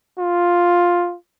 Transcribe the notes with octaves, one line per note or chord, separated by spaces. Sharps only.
F4